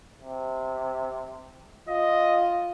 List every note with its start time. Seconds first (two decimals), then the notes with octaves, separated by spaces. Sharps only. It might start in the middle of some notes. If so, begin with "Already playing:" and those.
0.21 C3
1.88 F4 D#5